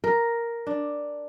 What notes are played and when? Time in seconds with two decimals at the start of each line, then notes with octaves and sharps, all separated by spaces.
0.04 A#4
0.67 D4